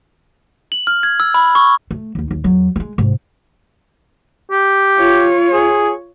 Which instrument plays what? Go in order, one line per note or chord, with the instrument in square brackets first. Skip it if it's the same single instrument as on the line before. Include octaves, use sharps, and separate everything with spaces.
[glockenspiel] F#7
F6
G#6
E6
B5
C#6
[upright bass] A3
D#2 D#4
D#2
E2 F#3
G3 G#3
G#2 C3
[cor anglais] G4
[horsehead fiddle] F4 C#5
[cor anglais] G#4